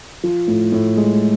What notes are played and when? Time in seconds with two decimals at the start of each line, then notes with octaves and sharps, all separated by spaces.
0.23 F3
0.48 A2
0.72 A2
0.97 G#3